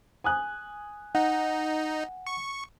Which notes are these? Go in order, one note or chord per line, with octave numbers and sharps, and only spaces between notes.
G#5 D#6 F#6
D#4 F#5
C#6